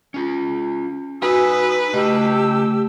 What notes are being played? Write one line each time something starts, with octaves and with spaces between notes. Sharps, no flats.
C#4 F4
D#4 F#4 B4 G#5 D#6 E6
C#3 A3 G4 D#5 E6